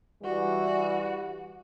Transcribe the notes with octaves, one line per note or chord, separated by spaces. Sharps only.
E3 G3 F#4